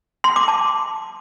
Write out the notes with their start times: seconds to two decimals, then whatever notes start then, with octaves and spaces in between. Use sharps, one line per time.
0.24 C6
0.36 D6
0.48 A5